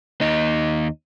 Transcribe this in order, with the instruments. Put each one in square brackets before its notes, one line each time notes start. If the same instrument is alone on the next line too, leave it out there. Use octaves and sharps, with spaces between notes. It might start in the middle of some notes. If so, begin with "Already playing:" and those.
[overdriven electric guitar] D#2 D#4